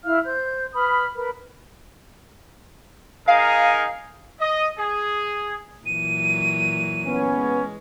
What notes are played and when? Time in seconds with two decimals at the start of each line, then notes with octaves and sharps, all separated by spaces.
0.04 E4 F5 F6
0.24 C5 G6
0.74 B4 B5 D#6 F6
1.16 A#4 B4 B5
3.28 D#4 G#4 A#4 F5
4.40 D#5
4.78 G#4
5.86 A#2 E3 F#3 D#7
7.05 B3 C#4
7.36 G#3